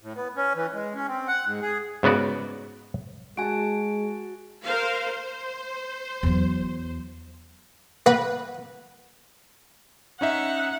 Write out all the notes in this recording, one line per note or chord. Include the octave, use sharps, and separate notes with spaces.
A2
B3
C#4
E3
G#3
C#4
C4
F#5
G#2
G#4
G#2 C#3 B3 F#4 D5
G#3 F#4 G#5 A5 D7
A#4 C5 F5
C5
E2 F#3
A#3 B4 F#5
C#4 D#4 E5 F#5